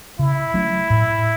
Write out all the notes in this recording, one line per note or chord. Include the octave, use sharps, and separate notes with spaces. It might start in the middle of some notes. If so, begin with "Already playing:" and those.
C#3 E4
F#3 A3 C#4
A2